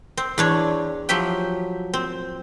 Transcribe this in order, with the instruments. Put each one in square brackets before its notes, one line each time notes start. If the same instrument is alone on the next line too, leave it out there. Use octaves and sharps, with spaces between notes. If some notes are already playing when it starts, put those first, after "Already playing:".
[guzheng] C4
E2 D4 C#5
F3 F#3 G4 E5 G5
C4